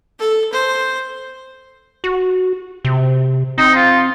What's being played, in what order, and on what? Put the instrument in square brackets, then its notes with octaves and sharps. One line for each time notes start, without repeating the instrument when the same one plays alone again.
[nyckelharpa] A4
C5
[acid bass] F#4
C3
[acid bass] C4 [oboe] D#4
[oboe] F4